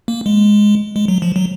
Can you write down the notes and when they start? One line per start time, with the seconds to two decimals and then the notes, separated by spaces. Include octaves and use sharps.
0.08 A#3
0.26 G#3
0.96 G#3
1.08 F#3
1.22 F3
1.36 F#3